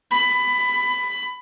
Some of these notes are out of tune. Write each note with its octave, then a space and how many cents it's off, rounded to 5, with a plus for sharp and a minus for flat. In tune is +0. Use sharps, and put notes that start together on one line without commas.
B5 +15